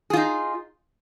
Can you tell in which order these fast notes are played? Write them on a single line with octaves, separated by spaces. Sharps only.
G#4 F4 D#4